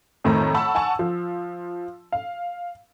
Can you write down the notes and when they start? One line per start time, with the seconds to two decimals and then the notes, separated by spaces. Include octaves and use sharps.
0.24 F2 A2 D#3 C4 A#5
0.54 F#5 A5 B5 C#6 E6
0.75 F#5 G#5 A5 C#6
0.99 F3
2.12 F5